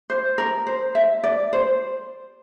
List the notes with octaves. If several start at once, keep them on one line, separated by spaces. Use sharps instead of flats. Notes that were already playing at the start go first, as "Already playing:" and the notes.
C5
A#4
C5
E5
D5
C5